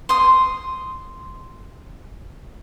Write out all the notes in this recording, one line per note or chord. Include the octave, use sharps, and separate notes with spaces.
C6 D#6